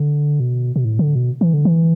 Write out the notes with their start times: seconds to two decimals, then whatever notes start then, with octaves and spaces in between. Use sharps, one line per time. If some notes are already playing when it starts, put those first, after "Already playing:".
Already playing: D3
0.40 B2
0.76 B2
0.85 A2
0.99 D3
1.15 B2
1.41 E3
1.53 D3
1.65 E3